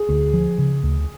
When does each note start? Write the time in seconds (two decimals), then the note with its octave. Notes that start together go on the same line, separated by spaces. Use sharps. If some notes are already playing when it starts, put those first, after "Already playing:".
Already playing: G#4
0.09 D2
0.33 F3
0.58 C#3
0.83 D2